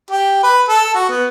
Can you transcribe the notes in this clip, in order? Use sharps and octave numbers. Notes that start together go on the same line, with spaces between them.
G4
B4
A4
F#4
B3